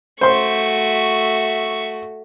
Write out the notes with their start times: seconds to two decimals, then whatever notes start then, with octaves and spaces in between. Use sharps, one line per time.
0.21 A3 F#4 C5 E5 C6 C#6